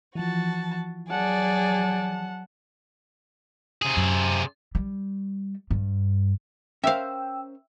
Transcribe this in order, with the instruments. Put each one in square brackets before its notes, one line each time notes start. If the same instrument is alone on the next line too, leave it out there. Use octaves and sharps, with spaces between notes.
[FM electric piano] E3 F3 [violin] F#4 A5
[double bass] F#3 [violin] G#4 D5 [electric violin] F#5 A5
[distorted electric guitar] C3 G#4
[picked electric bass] F#2
[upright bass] G3
G2
[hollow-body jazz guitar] C#4 A#4 C5 [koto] E5 F5 [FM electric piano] G5 E6